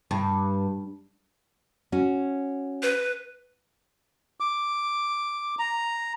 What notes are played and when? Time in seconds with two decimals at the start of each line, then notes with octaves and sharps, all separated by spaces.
0.11 G2
1.92 C#4 F#4
2.83 B4
4.40 D6
5.59 A#5